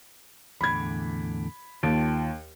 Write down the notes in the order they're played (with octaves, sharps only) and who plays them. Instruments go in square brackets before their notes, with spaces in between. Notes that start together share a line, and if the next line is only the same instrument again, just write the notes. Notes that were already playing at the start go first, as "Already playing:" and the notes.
[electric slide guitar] E2 A2 D3 [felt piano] B5 G#6
[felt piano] D#2 [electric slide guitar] F4 G5 A5